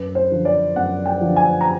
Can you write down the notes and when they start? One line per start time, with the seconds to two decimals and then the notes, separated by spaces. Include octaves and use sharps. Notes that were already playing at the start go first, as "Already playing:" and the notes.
Already playing: F#2 B4
0.15 C5
0.31 D3 F3
0.45 D5
0.76 F#2 F#5
1.05 G5
1.21 D3 F3
1.36 G#5
1.61 A#5